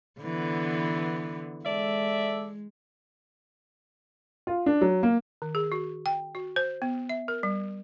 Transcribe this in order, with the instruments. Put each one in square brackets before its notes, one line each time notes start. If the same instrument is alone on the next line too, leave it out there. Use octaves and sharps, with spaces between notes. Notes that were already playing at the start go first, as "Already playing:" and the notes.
[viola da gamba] D3 E3 B3
[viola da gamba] G#3 [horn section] A4 D5 E5
[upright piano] F4
D4
F#3
A#3
[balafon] D#3
G#4
F#4
G5
F#4
C5
B3
E5
A#4
G3